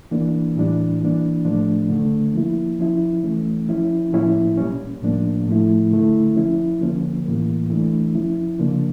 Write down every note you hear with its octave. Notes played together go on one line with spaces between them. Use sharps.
E3 A#3 D4
A2 E3 G3 D4
E3 A#3 D4
A2 F3 A3 D4
D3 A3 D4
F3 A#3 E4
F3 C#4 E4
E3 A3 C#4
F3 C#4 E4
A2 F3 A#3 C#4 E4
A#2 G3 C#4
A2 F3 A#3 D4
A2 F3 A3 E4
D3 A3 E4
F3 C#4 E4
D3 F3 A#3 C#4
A2 E3 G3 A#3
E3 A3 D4
F3 C#4 E4
C#3 F3 A#3 D4